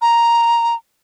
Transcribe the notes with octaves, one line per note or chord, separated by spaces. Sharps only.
A#5